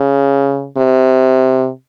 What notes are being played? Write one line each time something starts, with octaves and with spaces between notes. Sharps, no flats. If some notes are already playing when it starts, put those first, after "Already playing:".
Already playing: C#3
C3